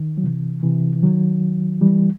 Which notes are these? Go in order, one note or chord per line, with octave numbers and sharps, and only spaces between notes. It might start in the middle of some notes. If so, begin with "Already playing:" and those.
Already playing: D#3
F#3
C3 E3
C3 E3
E3
D#3 F#3
E3 G3